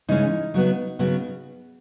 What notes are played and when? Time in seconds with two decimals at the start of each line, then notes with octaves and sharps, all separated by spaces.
0.09 C#3 E3 G#3 C#4 D#4
0.54 C#3 F#3 B3
0.99 C#3 F#3 B3